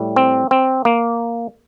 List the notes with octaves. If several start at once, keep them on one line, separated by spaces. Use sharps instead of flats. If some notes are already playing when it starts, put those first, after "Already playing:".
Already playing: A2 G3
C4
C4
A#3